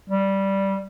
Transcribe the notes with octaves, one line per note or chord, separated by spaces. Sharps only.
G3